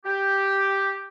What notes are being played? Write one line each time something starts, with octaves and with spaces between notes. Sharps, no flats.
G4